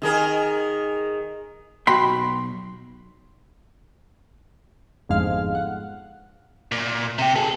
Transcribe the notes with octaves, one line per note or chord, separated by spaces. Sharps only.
D#3 G#4 A#4
B1 F#4 G5 B5 C6
G1 F2 G#2 F5
F#5
A#2
C3 G4
G#4 A4